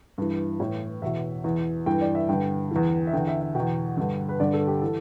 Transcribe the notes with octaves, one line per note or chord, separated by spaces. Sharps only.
G2 E3
A2 E3
E2 B2 E5
E2 E3
G2 E3 G5
D5
E5
G2 D3 G5
E2 E3
E5
E2 D3 G5
E5
E5
E2 B2 G5
G2 D3
B4
G2 D3 D5
A4
G4
E3 A4